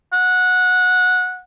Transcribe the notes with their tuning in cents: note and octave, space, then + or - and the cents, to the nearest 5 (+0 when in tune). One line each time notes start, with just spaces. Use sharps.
F#5 -15